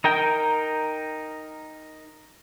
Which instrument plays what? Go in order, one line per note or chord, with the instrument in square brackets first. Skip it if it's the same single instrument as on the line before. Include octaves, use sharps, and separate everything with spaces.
[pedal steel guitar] D#4 A#4 G5